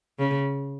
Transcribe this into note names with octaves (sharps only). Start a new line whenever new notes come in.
C#3